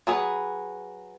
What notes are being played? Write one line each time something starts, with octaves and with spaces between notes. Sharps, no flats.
F#3 G#4 B4